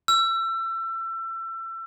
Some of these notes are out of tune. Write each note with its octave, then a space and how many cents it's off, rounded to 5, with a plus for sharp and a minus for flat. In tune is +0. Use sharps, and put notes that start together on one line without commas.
E6 +30